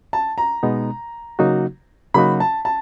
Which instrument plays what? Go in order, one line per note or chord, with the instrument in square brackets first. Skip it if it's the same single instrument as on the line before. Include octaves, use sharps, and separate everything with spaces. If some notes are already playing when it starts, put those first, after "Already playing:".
[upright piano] A5
A#5
[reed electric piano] B2 G#3 B3 D#4
C#3 F#3 A#3 D#4 F#4
[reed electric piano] C#3 F#3 A#3 D#4 F#4 [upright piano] B5
[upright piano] A5
A5